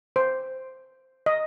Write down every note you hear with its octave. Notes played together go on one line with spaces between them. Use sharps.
C5
D#5